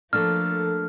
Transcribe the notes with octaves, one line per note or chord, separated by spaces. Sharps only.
F3 A3 A#3 D4 A4 F6